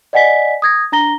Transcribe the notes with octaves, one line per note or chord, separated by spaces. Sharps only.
D5 D#5 F#5 G#5 B6
D#6 G#6 A#6
D4 A#5 A#6 G7